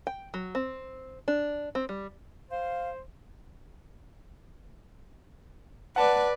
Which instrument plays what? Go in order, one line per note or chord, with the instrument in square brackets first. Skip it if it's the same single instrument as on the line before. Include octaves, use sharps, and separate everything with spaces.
[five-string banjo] G5
F#3
C4
D4
C4
G3
[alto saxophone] C5 [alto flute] F5
[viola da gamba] B4 D5 [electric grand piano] F#5 A5